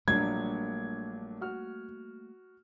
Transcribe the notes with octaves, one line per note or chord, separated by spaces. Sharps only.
A#1 F#3 G3 A3 A#3 D4 G#6
F#4 F6